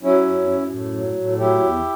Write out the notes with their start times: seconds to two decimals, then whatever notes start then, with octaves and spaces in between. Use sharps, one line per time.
0.03 F#3 C#4 E4
0.26 F#2
0.48 F#2
0.70 A2
0.93 F#3
1.16 A2
1.38 F#3 E4 G4
1.60 E2